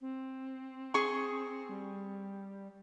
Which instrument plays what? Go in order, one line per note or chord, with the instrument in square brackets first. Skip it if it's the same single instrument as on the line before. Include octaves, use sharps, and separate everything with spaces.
[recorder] C4
[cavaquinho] G#4 C6 C#6
[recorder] G3